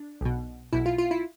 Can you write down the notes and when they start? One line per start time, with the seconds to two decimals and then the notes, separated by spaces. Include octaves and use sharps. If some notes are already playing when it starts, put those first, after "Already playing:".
Already playing: D4
0.21 B1 B2
0.73 B1 B2 E4
0.86 F4
0.98 F4
1.11 E4